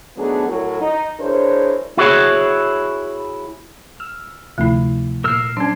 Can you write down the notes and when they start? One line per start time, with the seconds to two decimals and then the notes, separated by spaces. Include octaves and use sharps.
0.17 D#3 F#3 A3 B3 D4 G#4
0.48 A2 F#3 A#4
0.82 D#4
1.20 E3 D4 G#4 A#4 C5 C#5
1.97 E4 F#4 G#4 C#5
4.00 E6 F6
4.58 D2 C3 F3 A3 E4
5.24 A#2 A#4 E6 F6 C7
5.57 F#3 C#4 D4 C7